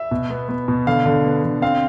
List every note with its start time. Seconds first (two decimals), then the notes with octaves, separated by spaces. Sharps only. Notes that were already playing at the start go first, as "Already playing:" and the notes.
Already playing: E5
0.11 B2
0.30 B3
0.49 B3
0.68 B2
0.87 D3 F5
1.06 D3
1.25 B3
1.43 D3
1.62 C4 F5